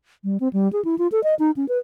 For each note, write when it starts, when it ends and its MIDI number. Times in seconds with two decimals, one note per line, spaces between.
0.24 0.38 55
0.40 0.48 60
0.53 0.71 55
0.73 0.83 68
0.85 0.95 64
0.99 1.08 65
1.12 1.23 69
1.24 1.35 75
1.39 1.51 63
1.57 1.66 61
1.69 1.78 71